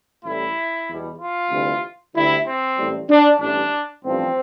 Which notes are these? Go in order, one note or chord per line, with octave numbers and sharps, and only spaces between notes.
A1 A2 E3 G3 E4
E2 B2 G3
F4
D2 C3 E3 G3
D2 D3 G3 E4
C4
A1 A2 G3
D4
A1 G2 E3 G3 D4
A1 G2 F3 C4